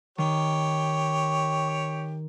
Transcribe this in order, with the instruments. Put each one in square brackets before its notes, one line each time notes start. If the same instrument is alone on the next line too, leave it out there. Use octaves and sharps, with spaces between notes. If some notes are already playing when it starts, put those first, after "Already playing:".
[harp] D#3 [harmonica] G4 C#5